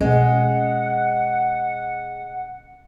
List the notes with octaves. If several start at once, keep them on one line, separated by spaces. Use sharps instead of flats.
B2 G#3 C#4 F#5